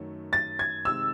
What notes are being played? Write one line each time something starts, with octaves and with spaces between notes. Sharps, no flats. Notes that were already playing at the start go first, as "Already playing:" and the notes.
Already playing: F#2 D#3 F#3 A3 C#4
A6
G#6
C3 D#3 G#3 C4 E6